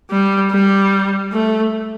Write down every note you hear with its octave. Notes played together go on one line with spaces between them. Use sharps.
G3
G3
A3